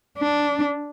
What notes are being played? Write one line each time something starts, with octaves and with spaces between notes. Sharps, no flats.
D4